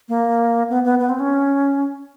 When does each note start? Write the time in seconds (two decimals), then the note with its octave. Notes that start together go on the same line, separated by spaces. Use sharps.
0.09 A#3
0.70 B3
0.84 B3
0.99 B3
1.09 C4
1.20 C#4